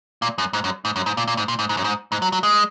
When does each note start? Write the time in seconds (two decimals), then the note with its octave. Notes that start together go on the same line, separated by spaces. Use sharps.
0.22 A#2
0.38 F#2
0.53 G#2
0.64 F#2
0.85 G#2
0.96 F#2
1.06 G#2
1.17 A#2
1.28 A#2
1.37 G#2
1.48 A#2
1.59 G#2
1.69 G#2
1.77 F#2
1.84 G#2
2.12 G#2
2.22 F#3
2.32 F#3
2.43 G#3